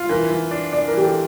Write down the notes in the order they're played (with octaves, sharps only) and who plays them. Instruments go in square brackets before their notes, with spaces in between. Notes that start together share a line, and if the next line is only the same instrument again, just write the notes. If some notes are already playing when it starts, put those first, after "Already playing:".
Already playing: [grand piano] F4
[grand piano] E3 [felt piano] A#4
[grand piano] E3
D4
[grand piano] D4 [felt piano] D5
[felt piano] A#4
[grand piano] E3 [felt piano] G4
[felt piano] A4